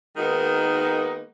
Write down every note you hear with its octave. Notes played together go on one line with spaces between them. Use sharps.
D#3 G#3 A#3 B3 D#4 F#4